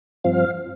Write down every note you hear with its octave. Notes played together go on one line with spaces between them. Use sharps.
G2 F3 C4 F5